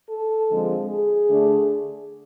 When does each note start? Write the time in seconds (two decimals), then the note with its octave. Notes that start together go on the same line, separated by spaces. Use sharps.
0.09 A4
0.48 D3 F3 G#3 C4
0.88 G#4
1.27 D3 A3 D4